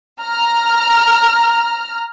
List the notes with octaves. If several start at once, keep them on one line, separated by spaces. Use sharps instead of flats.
A#5 F6